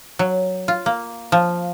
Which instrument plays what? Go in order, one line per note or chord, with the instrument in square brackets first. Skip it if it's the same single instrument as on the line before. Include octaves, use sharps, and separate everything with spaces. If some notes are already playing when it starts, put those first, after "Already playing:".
[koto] F#3
F4
A#3
F3